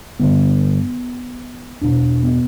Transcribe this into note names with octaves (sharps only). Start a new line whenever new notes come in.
G2 D3 B3
E2 B2 D4
B3